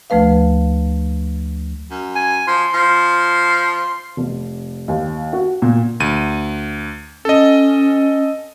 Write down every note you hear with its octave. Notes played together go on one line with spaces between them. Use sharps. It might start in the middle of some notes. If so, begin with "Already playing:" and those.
D2 F3 A3 B4 F5
F#2
G#5
F3 C6
F3
F1
D#2
F#4
A#2
D2 D#7
C#4 A4 D#5